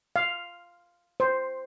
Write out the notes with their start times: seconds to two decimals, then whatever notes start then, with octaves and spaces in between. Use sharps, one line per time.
0.16 F5
1.20 C5